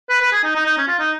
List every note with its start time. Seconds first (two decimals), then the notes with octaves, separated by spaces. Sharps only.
0.09 B4
0.22 B4
0.32 G#4
0.44 D#4
0.55 D#4
0.66 D#4
0.78 C#4
0.88 F4
0.99 D#4